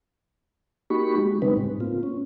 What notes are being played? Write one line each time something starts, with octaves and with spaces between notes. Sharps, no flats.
A#3 D#4 F#4 G4 B5 C#6
G#3
C#3 G3 G#3 C4 D#4 B4
A2
A#3 C4 F4
C#4